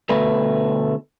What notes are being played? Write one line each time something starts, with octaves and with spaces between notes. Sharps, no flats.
D2 B2 A3 B4